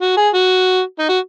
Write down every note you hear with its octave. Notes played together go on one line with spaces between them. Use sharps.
F#4
G#4
F#4
D#4
F#4